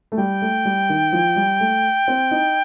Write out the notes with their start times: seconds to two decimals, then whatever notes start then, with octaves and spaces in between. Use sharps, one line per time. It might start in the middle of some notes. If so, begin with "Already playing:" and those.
0.12 A3
0.18 G3 G5
0.42 A3
0.65 G3
0.90 D#3
1.13 F3
1.36 G3
1.60 A3
2.08 C4
2.31 D#4